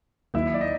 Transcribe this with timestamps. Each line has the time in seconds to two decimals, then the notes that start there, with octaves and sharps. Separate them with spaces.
0.34 D#2 D#3 F#3 A#3 E4 E5
0.54 D5
0.61 D#4 D#5